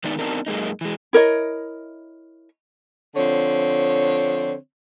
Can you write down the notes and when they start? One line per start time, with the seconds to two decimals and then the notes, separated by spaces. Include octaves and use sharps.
0.04 D#3 G#3 B3 D4 D#4 D5
0.19 B3 C4 D4 D#4 A#4
0.46 F#2 G#3 A#3 D#4
0.81 E3 G#3
1.13 E4 A#4 C#5 D#5
3.16 D3 F3 C4 C#5